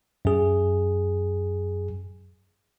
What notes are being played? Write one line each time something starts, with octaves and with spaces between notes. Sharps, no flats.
F#2 G#4